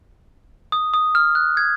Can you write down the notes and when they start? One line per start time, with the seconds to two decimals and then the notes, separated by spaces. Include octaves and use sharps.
0.72 D#6
0.94 D#6
1.15 F6
1.35 F#6
1.57 G#6